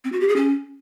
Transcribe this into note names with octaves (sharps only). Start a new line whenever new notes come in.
C4
F#4
G4
G#4
C#4